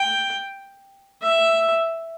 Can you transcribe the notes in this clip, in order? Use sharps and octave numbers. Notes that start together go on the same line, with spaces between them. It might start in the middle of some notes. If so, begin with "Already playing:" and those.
Already playing: G5
E5